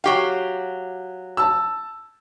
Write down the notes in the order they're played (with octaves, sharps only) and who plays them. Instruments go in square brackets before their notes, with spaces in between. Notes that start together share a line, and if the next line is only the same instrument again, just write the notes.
[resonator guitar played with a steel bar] F#3 G4 F5 [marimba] G5 C#6
[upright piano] A5 E6